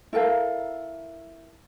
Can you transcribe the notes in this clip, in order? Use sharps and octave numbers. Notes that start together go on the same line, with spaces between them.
E4 A4 A#4 F5